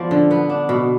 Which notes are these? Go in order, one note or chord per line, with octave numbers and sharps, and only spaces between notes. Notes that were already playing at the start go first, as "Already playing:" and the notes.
Already playing: F3 B3 D5
D3
B3
D4
B2